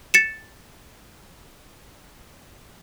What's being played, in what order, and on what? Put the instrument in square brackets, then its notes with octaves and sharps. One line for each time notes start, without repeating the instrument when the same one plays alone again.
[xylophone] A6 C#7 E7